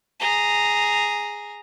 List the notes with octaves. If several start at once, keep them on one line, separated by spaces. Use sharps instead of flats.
G#4 A#5